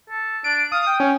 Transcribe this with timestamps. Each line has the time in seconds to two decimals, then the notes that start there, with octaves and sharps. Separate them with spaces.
0.10 A4
0.44 D4 D7
0.72 F5 D#6
0.87 G5
1.00 C#4